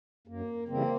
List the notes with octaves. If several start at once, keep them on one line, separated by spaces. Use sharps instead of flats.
F#2 A#3
C#3 E3 G3 A#3 C4